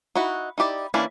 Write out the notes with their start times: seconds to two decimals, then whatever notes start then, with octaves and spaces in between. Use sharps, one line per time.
0.15 D#4 E4 F#4
0.58 D#4 E4 G4 D5
0.94 E3 A#3 C#4 D4 E4